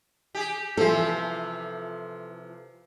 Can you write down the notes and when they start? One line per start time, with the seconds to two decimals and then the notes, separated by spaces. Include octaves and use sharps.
0.35 G4 G#4
0.77 C3 E3 F3 F4 A4